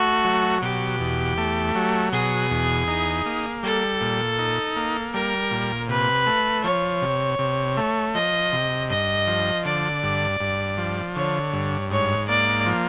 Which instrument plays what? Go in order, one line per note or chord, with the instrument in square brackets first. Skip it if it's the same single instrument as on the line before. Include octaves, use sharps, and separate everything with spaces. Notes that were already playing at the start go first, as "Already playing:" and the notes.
Already playing: [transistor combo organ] A3 [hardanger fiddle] F#4
[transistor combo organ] F#3
[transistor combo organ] B2 [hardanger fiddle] G4
[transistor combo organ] E2
A3
F#3
[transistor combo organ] B2 [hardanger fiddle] G#4
[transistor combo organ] E2
D#4
A#3
[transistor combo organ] G3 [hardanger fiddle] A4
[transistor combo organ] A#2
D#4
A#3
[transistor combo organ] G3 [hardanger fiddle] A#4
[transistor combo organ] A#2
[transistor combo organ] C3 [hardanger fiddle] B4
[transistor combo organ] A3
[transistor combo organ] F3 [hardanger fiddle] C#5
[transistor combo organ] C3
C3
A3
[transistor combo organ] F3 [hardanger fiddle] D#5
[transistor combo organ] C3
[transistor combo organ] G2 [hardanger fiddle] D#5
[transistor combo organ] F3
[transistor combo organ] D3 [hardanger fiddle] D5
[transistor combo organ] G2
G2
F3
[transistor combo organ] D3 [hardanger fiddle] C#5
[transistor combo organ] G2
[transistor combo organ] G#2 [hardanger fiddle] C#5
[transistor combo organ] A#3 [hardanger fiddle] D5
[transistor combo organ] F3